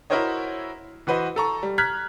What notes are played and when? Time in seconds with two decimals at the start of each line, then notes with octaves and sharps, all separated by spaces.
0.10 E4 F#4 A#4 C5 C#5 D#5
1.07 E3 F#4 B4 C5 D#5
1.36 A4 A#5 C#6
1.63 G3
1.78 A#5 F6 F#6 G#6 B6